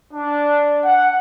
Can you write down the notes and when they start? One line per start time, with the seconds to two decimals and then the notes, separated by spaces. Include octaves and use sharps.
0.13 D4
0.84 F#5